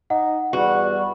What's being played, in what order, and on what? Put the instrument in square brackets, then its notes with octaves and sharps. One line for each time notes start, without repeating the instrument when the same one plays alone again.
[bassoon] D#4 [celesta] F#5
[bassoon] E2 [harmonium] G3 [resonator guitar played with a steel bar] F#4